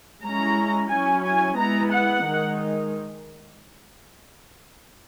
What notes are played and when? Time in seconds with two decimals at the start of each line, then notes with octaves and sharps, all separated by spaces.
0.23 G#3 C#4 E4 A#5
0.90 F#3 C#4 E4 G#5
1.24 G#5
1.58 G#3 B3 E4 A#5
1.92 F#5
2.25 D#3 G#3 D#4